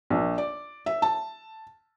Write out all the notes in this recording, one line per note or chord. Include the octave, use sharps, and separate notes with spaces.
A#1
D5
E5
A5